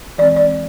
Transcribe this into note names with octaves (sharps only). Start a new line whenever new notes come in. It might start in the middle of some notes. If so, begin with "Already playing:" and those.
E3 G#3 C4 D5
D5